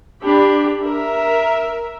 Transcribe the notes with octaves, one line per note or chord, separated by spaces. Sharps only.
D4 G4 B5
A#4 E5